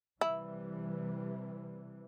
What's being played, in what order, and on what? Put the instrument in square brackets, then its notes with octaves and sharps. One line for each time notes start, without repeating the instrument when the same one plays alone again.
[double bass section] C3 E3 G3 [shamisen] E4